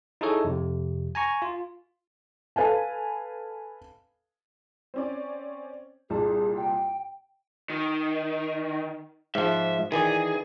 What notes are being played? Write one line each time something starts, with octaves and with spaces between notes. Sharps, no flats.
D#4 E4 G#4 A4 C#5
F2 C3
G#5 A#5 C#6
F4
A4 B4 F5 G#5 A5
C4 C#4 D5
C2 A#2 G#4 A5
G5
D#3
G#2 F3 E5
D#3 E3 G#4 D5